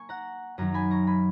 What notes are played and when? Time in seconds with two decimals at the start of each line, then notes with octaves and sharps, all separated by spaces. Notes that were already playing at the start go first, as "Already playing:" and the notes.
Already playing: A#3 G#5 C#6
0.09 F#5 A#5
0.58 F#2 D#3 F#3 F#5 A#5
0.74 G#5 B5
0.91 A#5 C#6
1.07 G#5 B5